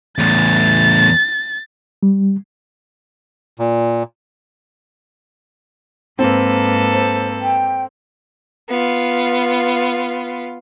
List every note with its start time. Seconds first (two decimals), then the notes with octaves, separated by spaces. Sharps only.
0.18 E2 A2 A6
2.03 G3
3.59 A#2
6.19 G#2 A#3 C4 A4 B4
6.91 C5
7.42 G5
8.69 B3 F4